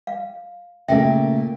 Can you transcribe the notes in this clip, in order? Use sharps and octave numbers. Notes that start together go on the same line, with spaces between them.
F5
A#2 C#3 A3 A#3 G4 E5 G5